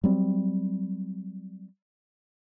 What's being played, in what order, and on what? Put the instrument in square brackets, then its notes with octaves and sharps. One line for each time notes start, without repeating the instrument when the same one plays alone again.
[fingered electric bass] F#3 G3 C4